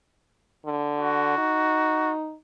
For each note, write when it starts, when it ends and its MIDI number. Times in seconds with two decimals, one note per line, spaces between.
0.65 1.34 50
0.98 2.11 66
1.38 2.35 63